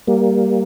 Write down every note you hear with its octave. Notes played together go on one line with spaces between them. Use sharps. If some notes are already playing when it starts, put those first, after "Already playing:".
G3 A#3